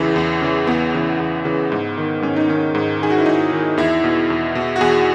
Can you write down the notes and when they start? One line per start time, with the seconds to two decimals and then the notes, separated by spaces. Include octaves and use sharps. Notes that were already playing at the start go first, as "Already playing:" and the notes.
Already playing: E2 C#3 E3
0.16 E2
0.42 C#3 E3
0.67 E2 B3
0.94 C#3 E3
1.20 E2
1.45 C#3 E3
1.72 G#2
1.98 D#3
2.22 G#2 C#4
2.36 D#4
2.48 D#3 C#4
2.75 G#2
3.00 D#3 G#4
3.10 F#4
3.18 E4
3.26 G#2 D#4
3.52 D#3
3.77 E2 E4
4.04 B2
4.30 E2
4.55 B2
4.76 F#4
4.81 E2 G#4